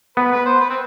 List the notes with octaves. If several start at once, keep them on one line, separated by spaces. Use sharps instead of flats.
B3 B4
B4
C5
B4
C4